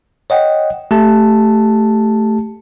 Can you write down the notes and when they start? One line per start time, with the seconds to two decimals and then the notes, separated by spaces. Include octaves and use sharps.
0.30 C#5 D#5 F#5 G5
0.91 A3 G4 A5